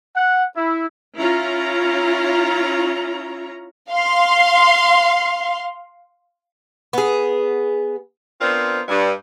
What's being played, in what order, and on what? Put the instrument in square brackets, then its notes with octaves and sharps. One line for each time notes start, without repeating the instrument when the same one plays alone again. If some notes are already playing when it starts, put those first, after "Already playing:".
[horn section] F#5
E4
[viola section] C#4 E4 F4 C#5 A#5
[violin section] F5 C6
[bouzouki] B3 G#4
[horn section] B3 C4 D4 F4 A#4 C5
G2